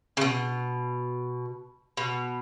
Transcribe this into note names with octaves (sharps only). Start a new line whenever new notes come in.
C#3
B2
B2